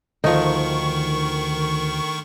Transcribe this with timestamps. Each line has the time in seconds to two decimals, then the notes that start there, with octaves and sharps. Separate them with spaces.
0.24 D2 D#3 F3 D#4 C#6